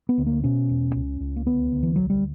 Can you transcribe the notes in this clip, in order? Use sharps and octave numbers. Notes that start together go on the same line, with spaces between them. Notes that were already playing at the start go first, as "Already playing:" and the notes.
B3
D2
A#3
B2 C#4
E1
C#2
C#2
A#3
D2 B3
D2
E3
B1 F#3
G3